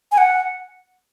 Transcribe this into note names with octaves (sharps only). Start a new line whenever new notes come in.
G#5
F#5